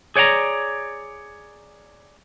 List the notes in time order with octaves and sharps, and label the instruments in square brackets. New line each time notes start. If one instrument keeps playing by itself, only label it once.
[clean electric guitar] G#4 C#5 D5 F#5 A#5